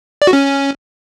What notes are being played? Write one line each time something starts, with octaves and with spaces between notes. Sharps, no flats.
D5
F#4
C#4